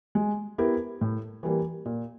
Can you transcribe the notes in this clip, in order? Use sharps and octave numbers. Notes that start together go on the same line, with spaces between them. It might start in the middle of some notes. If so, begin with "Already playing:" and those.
G#3
B3 E4 G4 A#4
A2
E3 G3 A#3
A#2